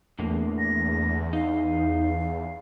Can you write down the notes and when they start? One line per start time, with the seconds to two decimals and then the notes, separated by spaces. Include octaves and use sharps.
0.19 E2 A2 D3 A#3
0.59 A#6
1.33 D#4 F5